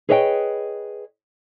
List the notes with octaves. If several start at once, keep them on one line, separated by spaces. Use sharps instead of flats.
G#4 B4 C#5 D#5 E5 G5